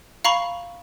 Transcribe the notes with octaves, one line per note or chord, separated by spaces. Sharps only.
F5 A#5 B5 C#6